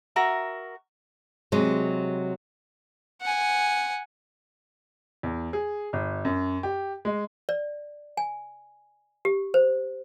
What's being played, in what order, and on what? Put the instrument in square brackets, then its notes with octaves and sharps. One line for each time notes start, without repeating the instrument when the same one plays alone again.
[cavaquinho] F#4 A#4 E5
[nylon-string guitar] C3 F#3 G#3
[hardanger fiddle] F#5 G#5
[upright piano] E2
G#4
G1
F#2
G4
G#3
[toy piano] D5
G#5
G4
C5